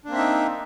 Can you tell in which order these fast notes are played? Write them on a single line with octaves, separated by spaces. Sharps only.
D4 A#3 C4 E5 D#4